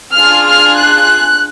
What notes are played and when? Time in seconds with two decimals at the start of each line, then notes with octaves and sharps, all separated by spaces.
0.13 D4 F4 G#4 F6
0.46 F6
0.77 F#6